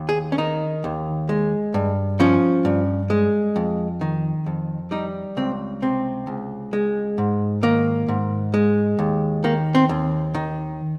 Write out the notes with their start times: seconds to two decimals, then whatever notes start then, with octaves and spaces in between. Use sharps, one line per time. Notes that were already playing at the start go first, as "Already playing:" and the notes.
Already playing: D#2
0.09 G#4
0.32 C#4
0.38 D#3 D#4
0.84 D#2
1.29 G#3
1.74 G2
2.20 F3 C#4
2.65 G2
3.10 G#3
3.56 F2
4.01 D#3
4.46 F2
4.91 G3 D#4
5.37 C#2 C4
5.82 C3 C4
6.27 C#2
6.73 G#3
7.18 G#2
7.63 D#3 A#3
8.08 G#2
8.54 G#3
8.99 D#2
9.44 D#3 A#3
9.75 C4
9.89 D#2
10.34 D#3